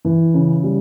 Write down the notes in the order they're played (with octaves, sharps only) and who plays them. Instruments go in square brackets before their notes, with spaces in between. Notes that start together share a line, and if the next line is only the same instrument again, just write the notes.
[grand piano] E3
C#3
G3